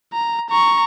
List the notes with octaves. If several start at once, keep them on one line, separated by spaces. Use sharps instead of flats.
A#5
A#5 C#6